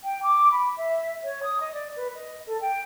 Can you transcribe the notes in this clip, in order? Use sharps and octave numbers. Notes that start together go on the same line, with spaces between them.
G5
D6
B5
E5
C#5
D#6
D#5
D5
B4
D#5
A4
G5